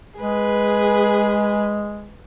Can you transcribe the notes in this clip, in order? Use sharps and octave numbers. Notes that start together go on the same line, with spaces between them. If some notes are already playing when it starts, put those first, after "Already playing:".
G#3 G#4 B4